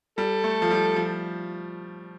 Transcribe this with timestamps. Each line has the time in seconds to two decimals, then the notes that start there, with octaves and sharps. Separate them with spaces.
0.18 G3 A4
0.44 A3
0.62 F3
0.71 G3
0.96 F3